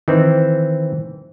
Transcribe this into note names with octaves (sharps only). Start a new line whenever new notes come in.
D#3 E3 C4